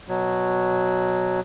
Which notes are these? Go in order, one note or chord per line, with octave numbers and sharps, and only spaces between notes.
B2 F#3